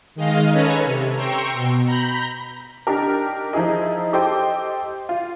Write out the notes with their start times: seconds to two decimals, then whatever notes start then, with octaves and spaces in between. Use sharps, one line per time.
0.15 D#3 G#3 D#5 F5
0.49 C#4 A4 B4 C#5 G#5 A#5
0.84 C3
1.16 G5 A#5 C6 C#6 E6
1.54 B2
1.86 A#5 B5 G6 B6
2.87 D4 D#4 G4 A#4
3.53 F3 D#4 E4 G#4 D#5
4.13 G4 A4 C5 D#5 G5 D6
5.09 F4